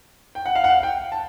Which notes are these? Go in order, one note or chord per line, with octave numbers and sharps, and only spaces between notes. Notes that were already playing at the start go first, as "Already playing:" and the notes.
G5
F#5
F5
F#5
F5
G5
A5